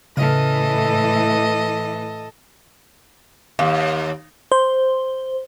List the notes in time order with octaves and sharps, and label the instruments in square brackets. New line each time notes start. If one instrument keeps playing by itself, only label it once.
[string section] A2 E3 [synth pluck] C#3 F6 D#7 [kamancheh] A4 D#5
[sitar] D#2 [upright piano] F5
[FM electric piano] C5